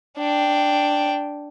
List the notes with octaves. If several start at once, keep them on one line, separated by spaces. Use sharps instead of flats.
D4 G5